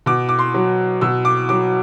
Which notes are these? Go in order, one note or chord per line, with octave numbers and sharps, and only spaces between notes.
B2 D6
D6
C6
F#3
B2 E6
D6
F#3 D6